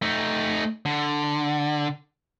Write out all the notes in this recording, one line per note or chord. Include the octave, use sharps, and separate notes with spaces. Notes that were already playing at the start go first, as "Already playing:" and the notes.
A3 D#4
D3